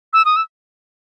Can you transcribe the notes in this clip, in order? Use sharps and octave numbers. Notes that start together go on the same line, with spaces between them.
E6
D#6
E6